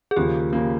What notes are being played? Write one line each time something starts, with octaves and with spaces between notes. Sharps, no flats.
G#4
D#2 C#3 F3 A#3 G4
C#3 F3 A#3